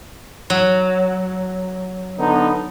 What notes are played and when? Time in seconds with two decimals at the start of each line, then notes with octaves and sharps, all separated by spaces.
0.50 F#3
2.19 D3 B3 D#4